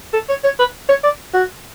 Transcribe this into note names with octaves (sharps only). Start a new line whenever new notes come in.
A4
C#5
C#5
B4
C#5
D5
F#4